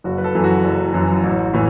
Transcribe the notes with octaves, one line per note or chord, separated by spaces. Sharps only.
F#1 F#4
B4
A4
F#2 E3
F#4
F#1
F#2 E3
A1
A2 E3